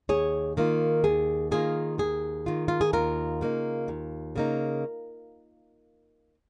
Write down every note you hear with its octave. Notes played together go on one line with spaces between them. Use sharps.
D#2 G#4 C#5
D#3 A#3 F4
D#2 G#4
D#3 A#3 F4 G#4
D#2 G#4
D#3 A#3 F4
F4
G#4
D#2 F4 A#4
C#3 A#3 D#4
D#2
C#3 A#3 D#4